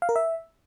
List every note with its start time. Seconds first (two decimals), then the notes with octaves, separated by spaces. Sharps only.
0.02 F5
0.09 A#4
0.16 E5